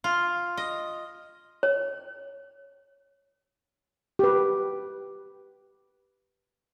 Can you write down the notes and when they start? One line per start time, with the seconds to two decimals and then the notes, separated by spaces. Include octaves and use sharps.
0.04 F4
0.57 D#5
1.63 C#5
4.19 G4 B4